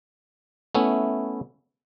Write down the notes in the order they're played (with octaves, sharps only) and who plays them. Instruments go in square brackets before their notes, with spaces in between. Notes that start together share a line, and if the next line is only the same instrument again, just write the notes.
[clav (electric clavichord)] A3 B3 C#4 E4